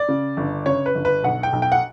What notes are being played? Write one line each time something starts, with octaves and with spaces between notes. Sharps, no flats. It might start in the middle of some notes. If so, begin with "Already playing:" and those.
Already playing: D5
C#3
G1
C#3 C#5
B4
G1
B4
B1 F#5
G5
B1
G5
F#5